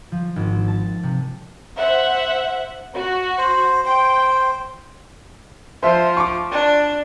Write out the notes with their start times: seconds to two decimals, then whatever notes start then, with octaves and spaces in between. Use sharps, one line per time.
0.12 F3
0.36 G#1
0.68 A5
1.03 C3
1.77 C5 E5 F#5
2.96 F#4
3.38 C5
3.85 C5 G5
5.83 F3 C5 E5
6.17 C#6 D6
6.52 D4